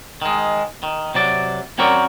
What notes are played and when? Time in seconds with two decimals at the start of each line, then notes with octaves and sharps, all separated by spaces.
0.22 D#3 G#3
0.83 D#3
1.15 C3 F#3 D5
1.78 F#2 C4 F#4 A#4 C#5 D5